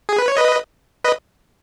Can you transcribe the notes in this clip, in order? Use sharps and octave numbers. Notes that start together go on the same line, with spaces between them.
G#4
B4
C#5
B4 D#5
B4 D#5